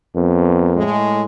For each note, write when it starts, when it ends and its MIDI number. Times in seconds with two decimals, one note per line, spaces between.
0.16 0.82 41
0.16 0.75 59
0.16 0.75 70
0.76 1.25 45
0.76 1.25 56